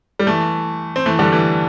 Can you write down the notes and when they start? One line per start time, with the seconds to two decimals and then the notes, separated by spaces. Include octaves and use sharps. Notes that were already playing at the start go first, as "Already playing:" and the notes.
0.19 G3
0.27 E3 A3
0.96 C4
1.06 E3 A3
1.19 D3 G3
1.32 E3 A3